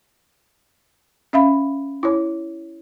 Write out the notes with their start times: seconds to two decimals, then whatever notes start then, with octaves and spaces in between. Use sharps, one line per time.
1.33 C#4 E5 F5 B5
2.03 E4 C#5